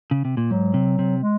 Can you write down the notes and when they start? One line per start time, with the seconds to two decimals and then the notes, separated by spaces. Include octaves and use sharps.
0.11 C#3
0.25 C3
0.37 A#2
0.50 G#2 F#3
0.74 C3
0.99 C3
1.22 G#3